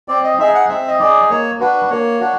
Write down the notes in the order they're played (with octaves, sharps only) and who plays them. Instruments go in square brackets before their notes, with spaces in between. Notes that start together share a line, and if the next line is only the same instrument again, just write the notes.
[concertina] C4 D5
D#5
D#4 G#4 E5
F#5
C4 E5
D#5
D#4 G#4 D5
A#3 C#5
D4 F#4 B4
A#3 C#5
D4 F#4